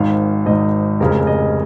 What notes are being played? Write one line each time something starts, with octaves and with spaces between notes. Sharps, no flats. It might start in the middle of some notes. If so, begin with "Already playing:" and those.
Already playing: G#1 G#2 D#3 F5
G#1 G#2 D#3 D#5
F1 F2 C#3 G#3 A#4
D#5